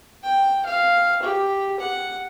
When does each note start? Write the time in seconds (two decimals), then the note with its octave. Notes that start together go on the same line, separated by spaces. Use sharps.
0.23 G5
0.66 F5
1.23 G4
1.80 F#5